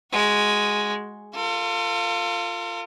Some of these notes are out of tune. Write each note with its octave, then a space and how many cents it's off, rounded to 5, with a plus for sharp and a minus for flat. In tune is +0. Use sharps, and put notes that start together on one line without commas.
G#3 +0 F#4 -5
F4 +0 A4 +45